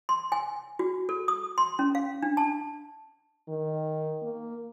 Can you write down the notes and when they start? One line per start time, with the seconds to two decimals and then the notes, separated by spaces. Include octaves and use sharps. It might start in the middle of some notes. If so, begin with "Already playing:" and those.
0.09 C6
0.32 G#5
0.79 F#4
1.09 A4
1.28 D#6
1.58 C6
1.79 C#4
1.95 F5
2.22 D4
2.37 A5
3.49 D#3
4.22 A#3